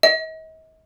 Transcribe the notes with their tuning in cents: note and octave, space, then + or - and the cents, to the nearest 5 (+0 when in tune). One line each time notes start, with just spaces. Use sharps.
D#5 +40